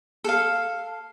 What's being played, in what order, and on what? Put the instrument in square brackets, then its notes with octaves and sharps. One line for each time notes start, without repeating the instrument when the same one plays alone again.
[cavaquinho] A4 F5